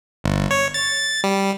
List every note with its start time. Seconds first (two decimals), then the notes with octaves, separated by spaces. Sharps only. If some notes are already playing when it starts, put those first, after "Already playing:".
0.24 G1
0.51 C#5
0.74 A6
1.24 G3